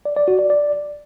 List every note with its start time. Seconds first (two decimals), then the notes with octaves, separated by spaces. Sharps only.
0.05 D5
0.17 D5
0.28 F#4
0.39 D5
0.50 D5